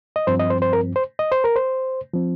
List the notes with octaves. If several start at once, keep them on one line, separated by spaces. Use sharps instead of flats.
D#5
G2 F3 C4 C5
D#5
C5
C5
A#4
C5
D#5
C5
A#4
C5
F3 C4